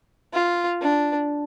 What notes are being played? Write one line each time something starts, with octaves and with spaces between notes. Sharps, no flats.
F4
D4